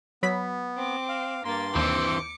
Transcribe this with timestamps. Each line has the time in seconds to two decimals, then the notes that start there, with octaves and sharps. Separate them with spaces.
0.23 F#3 B3 B5 B6
0.77 C4 D6
1.09 F5
1.45 G2 A#3 C6 A6
1.75 D#2 E3 C4 D6 C#7